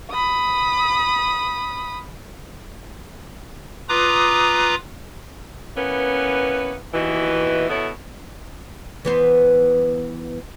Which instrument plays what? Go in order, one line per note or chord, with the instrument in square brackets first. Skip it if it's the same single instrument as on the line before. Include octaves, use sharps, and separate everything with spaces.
[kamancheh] B5 D#6
[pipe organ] F4 B4 A#5 D6 D#6
[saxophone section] E3 A#3 B3 C#4
D#2 B2 E3
B2 B3 E4 A4 C#5
[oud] E3 B3 C5